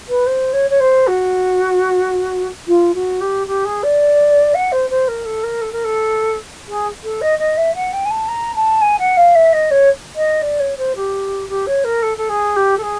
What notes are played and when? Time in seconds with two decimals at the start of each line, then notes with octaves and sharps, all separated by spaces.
0.08 B4
0.26 C5
0.53 C#5
0.70 C#5
0.80 C5
1.07 F#4
2.67 F4
2.94 F#4
3.20 G4
3.47 G4
3.65 G#4
3.83 D5
4.54 F#5
4.72 C5
4.90 C5
5.08 A#4
5.25 A4
5.43 A#4
5.61 A4
5.72 A#4
5.84 A4
6.68 G#4
7.03 A4
7.21 D#5
7.38 D#5
7.57 E5
7.74 F#5
7.92 G5
8.05 G#5
8.10 A5
8.28 A#5
8.55 A5
8.81 G#5
8.99 F#5
9.17 F5
9.35 E5
9.53 D#5
9.70 C#5
10.15 D#5
10.41 D5
10.59 C#5
10.77 C5
10.95 G4
11.49 G4
11.66 C#5
11.84 A#4
12.02 A4
12.17 A4
12.29 G#4
12.56 G4
12.77 A4
12.82 G#4